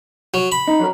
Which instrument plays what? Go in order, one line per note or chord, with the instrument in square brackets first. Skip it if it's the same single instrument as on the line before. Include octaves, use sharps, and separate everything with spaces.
[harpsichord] F#3
B5
[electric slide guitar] D#4
F#3 D4 A#4